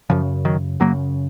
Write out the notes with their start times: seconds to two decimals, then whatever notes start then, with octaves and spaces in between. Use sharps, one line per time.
0.10 F#2 C#3 F3
0.45 D#3 F#3
0.80 F#2 C#3 F#3 A#3